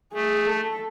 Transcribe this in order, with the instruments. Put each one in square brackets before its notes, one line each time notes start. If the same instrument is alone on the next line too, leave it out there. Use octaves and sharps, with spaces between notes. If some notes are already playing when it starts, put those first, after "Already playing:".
[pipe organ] A3 [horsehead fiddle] G#4
[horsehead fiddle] A4